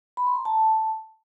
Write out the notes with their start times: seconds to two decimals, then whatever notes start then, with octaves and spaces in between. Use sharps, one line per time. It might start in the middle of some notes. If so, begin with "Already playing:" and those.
0.17 B5
0.27 C6
0.36 A#5
0.45 A5